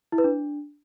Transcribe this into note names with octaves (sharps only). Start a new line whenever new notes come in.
E4
B4
D4